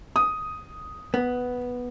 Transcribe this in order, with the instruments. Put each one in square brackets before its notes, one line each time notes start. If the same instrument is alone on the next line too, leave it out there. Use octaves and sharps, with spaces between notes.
[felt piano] D#6
[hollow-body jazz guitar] B3